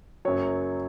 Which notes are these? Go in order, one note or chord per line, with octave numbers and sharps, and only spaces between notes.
F#1 F#2 F#3 C#5